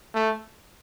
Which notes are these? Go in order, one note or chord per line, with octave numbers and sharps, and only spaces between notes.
A3